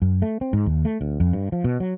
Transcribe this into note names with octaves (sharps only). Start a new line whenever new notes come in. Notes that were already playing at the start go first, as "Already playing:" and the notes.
F#2
A3
C4
G#2
D#2
A3
D2
F2
G2
F3
B2
F#3